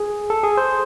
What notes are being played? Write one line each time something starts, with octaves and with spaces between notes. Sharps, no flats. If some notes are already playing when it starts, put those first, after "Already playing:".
Already playing: G#4
A4
G#4
C5